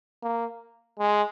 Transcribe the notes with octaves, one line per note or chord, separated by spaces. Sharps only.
A#3
G#3